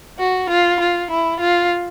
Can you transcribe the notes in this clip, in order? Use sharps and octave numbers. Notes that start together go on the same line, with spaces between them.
F#4
F4
F4
E4
F4